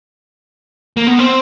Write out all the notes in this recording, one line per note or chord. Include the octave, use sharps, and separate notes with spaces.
A#3
B3
C4